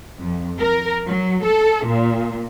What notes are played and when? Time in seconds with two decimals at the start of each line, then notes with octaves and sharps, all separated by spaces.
0.19 F2
0.59 A#4
1.07 F#3
1.44 A4
1.86 A#2